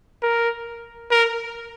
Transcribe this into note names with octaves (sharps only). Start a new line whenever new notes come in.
A#4
A#4